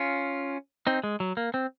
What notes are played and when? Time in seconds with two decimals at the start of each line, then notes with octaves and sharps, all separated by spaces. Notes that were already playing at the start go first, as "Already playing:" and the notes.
Already playing: C#4 F4
0.87 C4 D#4
1.04 G#3
1.20 F#3
1.37 A#3
1.54 C4